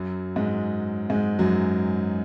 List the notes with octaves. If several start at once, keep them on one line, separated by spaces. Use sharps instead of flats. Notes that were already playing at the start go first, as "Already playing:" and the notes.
Already playing: F#2 F#3
G#2 G#3
G#2 G#3
F#2 F#3